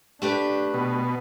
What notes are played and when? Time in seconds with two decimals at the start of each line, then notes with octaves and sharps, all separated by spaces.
0.22 A3 D4 G4 B4
0.74 B2